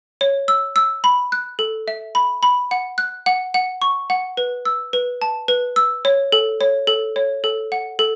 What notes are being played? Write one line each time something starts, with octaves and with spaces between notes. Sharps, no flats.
C#5
E6
E6
B5
F#6
A4
E5
B5
B5
F#5
F#6
F#5
F#5
C#6
F#5
B4
E6
B4
A5
B4
E6
C#5
A4
C#5
A4
C#5
A4
F#5
A4